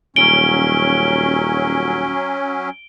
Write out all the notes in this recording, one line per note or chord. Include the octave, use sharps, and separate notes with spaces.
D#1 F#3 C#4 D7 G7